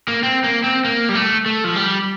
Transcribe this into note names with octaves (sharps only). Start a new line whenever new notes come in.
A#3
C4
A#3
C4
A#3
G3
A3
A3
F3
G3